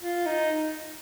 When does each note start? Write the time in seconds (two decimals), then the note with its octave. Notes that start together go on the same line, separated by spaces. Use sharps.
0.02 F4
0.26 D#4